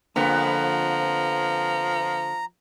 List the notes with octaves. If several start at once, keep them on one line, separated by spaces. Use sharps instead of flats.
F2 D3 F3 A#3 B3 A#5